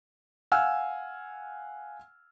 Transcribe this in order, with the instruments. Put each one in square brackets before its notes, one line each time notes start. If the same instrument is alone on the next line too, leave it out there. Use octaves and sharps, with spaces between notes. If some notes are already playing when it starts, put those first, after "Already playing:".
[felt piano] F5 F#5 G#5 E6 F6